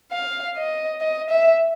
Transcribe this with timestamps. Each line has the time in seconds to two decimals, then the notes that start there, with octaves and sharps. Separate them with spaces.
0.12 F5
0.57 D#5
1.01 D#5
1.30 E5